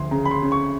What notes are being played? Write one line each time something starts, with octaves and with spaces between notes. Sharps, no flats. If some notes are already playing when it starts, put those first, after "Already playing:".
Already playing: D2 F3 C6
C#3 A#5
B5
C6
C#3
C#6